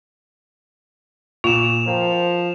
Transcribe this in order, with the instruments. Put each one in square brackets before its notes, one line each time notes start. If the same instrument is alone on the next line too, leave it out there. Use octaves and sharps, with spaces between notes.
[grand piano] A#2 A#3 [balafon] F4 [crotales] E7 F7
[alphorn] F3 [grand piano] A#4 C5 G5